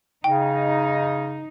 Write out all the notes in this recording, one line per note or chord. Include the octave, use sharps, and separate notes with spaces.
C#3 D#4 G5